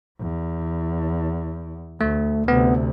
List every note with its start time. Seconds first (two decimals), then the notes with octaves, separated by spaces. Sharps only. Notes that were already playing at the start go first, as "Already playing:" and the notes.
0.20 E2
2.01 D2 A3
2.48 D2 C3 B3